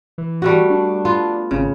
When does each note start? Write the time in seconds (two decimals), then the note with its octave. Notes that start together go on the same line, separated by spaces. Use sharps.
0.18 E3
0.42 G3 A3 F#4
0.70 D4
1.05 B3 F4
1.51 G#1 C#3